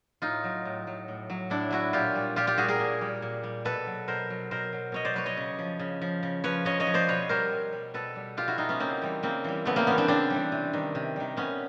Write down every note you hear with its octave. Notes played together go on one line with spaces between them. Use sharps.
A2 D#4 F4
F#3
A2
F#3
A2
F#3
A2 D4 E4
F#3 E4 F#4
A#2 F4 G4
G3
A#2 F4 G4
F4 G4
G3 F#4 G#4
G#4 A#4
A#2
G3
A#2
G3
B2 A4 B4
F#3
B2 A#4 C5
F#3
B2 A#4 C5
F#3
B2 C#5 D#5
C5 D5
F#3 B4 C#5
C#5 D#5
C#3
F3
C#3
F3
C#3
F3 B4 C#5
C#3 C#5 D#5
C#5 D#5
F3
C5 D5
B2 B4 C#5
G3 A#4 C5
B2
G3
B2 A4 B4
G3
B2 F4 G4
E4 F#4
G3 D#4 F4
B3 C#4
C#3 A#3 C4
E3 G3
C#3 A#3 C4
E3 G3
C#3 A3 B3
A#3 C4
E3 G3 B3 C#4
C4 D4
C#3 C4 D4
E3 G3
C3
D#3 G3
C3
D#3 G3
C3 B3 C#4